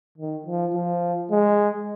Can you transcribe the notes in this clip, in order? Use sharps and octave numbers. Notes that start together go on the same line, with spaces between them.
D#3
F3
F3
G#3